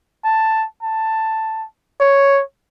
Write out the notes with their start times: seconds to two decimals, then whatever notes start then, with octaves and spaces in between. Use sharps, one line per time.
0.24 A5
0.83 A5
2.00 C#5